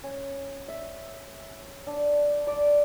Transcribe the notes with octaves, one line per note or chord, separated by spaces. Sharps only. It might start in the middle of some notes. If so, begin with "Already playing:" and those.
C#4
E5
D4
D5